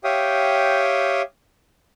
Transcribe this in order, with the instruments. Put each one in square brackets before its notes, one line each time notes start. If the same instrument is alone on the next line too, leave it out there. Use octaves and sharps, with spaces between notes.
[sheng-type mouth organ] G4 C#5 E5 F5 G5 D#6